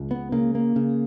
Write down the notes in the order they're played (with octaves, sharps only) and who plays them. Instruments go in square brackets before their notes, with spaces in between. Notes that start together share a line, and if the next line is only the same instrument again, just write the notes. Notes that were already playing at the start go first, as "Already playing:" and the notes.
Already playing: [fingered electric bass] C#2
B3
C#3 A#3
A#3
C#3